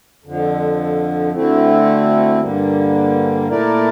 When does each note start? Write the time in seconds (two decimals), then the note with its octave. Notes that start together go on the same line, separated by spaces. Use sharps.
0.24 F2 D3 F3
1.32 D2 D3 A3 C4 E4
2.40 G2 D3 G3 A#3
3.48 A#2 A3 E4 A#4 D5